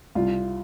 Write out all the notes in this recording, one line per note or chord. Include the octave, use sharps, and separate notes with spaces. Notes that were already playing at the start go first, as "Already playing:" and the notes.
C2 F4